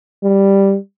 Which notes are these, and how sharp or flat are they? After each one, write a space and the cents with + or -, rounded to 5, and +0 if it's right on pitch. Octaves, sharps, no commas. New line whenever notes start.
G3 +0